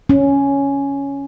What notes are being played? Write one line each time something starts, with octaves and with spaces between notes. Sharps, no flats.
C#4